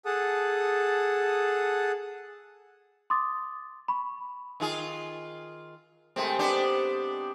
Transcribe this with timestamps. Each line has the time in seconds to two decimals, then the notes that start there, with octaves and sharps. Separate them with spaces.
0.06 G#4 A4 F#5 A5 D#6
3.10 C6 D6 D#6 A6
3.88 B5 C#6
4.60 D#3 F4 G#4
6.16 C3 D#3 G#3 A3 C4
6.39 B3 D4 G4 C5 D5 D#5